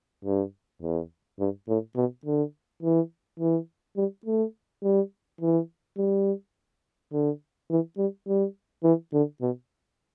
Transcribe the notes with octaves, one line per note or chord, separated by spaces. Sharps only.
G2
E2
G2
A2
B2
D3
E3
E3
G3
A3
G3
E3
G3
D3
E3
G3
G3
E3
D3
B2